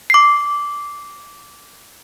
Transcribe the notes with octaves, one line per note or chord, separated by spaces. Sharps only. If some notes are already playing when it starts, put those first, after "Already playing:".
D6 C7